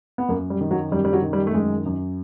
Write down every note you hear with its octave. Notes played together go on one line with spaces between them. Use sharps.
B3
F#2 A#3
G3
D#3
F#3
F#2 G3
G3
F#3
D#3
G3
A3
F#2 G#3
F#2